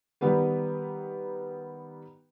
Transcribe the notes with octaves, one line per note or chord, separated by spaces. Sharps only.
D#3 G3 B3 G4 B4